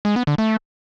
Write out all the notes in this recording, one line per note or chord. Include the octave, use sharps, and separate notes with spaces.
G#3
B3
D3
A3